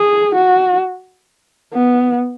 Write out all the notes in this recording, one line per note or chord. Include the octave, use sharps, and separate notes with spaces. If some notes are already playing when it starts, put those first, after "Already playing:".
Already playing: G#4
F#4
B3